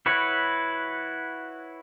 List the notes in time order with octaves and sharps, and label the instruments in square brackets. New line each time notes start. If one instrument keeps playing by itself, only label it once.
[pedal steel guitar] E4 F#4 B4 C#5